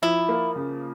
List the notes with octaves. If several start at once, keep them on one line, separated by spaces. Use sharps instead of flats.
F3 E4
A#3
C#3